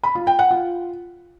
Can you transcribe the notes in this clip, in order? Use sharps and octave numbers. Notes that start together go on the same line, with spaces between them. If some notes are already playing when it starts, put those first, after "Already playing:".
B5
F4
G5
F#5
F4